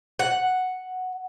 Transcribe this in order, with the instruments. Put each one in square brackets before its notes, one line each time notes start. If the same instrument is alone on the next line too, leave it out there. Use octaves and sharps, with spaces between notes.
[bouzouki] F#5